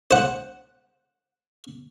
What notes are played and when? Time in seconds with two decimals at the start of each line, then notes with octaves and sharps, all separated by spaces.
0.11 C5 F#5